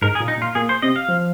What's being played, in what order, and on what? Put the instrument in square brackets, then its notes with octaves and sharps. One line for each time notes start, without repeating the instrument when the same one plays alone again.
[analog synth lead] G#2 [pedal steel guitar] A#4
[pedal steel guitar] G#4
[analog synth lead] A#2
[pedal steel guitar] D#4
[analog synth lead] A#2
[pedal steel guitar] F4
[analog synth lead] A#2 [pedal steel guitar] G#4
[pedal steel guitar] C5
[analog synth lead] C3 [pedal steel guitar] D#5
[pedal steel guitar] F5
[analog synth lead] F3